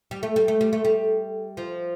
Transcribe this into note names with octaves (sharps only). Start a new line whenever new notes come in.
G3
A3
G3
A3
G3
A3
G3
F3